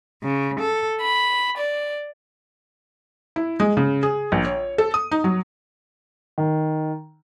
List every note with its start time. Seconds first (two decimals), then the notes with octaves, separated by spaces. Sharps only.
0.23 C#3
0.59 A4
1.01 B5
1.58 D5
3.36 E4
3.60 G#3
3.77 C#3
4.03 G#4
4.32 A#1
4.45 C#5
4.78 A4
4.94 D#6
5.12 D#4
5.24 F#3
6.38 D#3